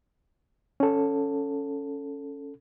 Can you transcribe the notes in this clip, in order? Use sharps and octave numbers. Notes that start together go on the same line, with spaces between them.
C#4 A4